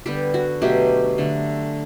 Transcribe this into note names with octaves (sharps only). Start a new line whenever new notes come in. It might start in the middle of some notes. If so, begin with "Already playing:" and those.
D3 G3 B3 G4
F#4
B2 F#3 A3 G4
D3 A3